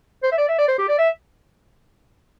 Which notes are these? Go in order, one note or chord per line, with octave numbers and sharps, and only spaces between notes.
C5
E5
D5
E5
D5
C5
G4
D5
E5